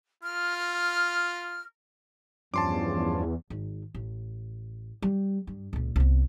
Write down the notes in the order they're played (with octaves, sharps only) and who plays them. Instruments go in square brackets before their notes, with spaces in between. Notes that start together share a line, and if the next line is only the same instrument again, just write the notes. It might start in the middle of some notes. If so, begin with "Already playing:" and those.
[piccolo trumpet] F4 [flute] F6
[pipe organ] E2 [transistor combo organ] G2 F3 C#4 [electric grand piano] A5 C6 D6
[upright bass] G#1
A1
G3
G2
C#2 A#2
C2 B3